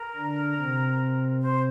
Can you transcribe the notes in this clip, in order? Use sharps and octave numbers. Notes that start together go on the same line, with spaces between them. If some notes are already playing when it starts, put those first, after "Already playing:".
Already playing: A#4
D3 D4
C3 C4
C5